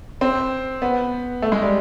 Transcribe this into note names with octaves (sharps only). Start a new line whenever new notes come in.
C4
B3
A3
G#3
G3